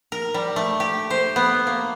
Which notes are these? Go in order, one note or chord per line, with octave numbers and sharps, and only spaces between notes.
A#4
G3
A3
G4
C5
B3
A#3